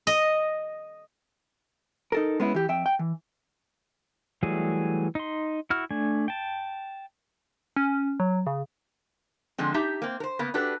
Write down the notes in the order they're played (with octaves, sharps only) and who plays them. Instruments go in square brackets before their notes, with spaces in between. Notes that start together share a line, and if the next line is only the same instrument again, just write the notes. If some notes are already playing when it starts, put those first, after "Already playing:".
[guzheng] D#5
[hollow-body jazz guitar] D#4 A4 A#4
G#3 B3 C#4 E4
E3 G4
F2 E5 G5
G5
E3
[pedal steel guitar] E3 F#3 G3 A3 G#4
D#4 C6
E4 F#4 F6
A3 D4 G#5
G5 A5
[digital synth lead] C#4
F#3
C#3
[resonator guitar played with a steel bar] D3 F3 G#3 C4
D#4 G4 E5 A5
A#3 C4
A#4 C5
C#3 A#3 B3
D4 F#4 G4 A4 B4